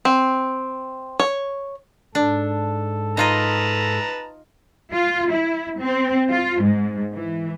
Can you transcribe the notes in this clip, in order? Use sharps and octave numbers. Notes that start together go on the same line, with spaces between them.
C4
C#5
G#2 D4 A4
D#4 F4 B4 D#5 A5 A#5
F4
E4
C4
F4
G#2
E3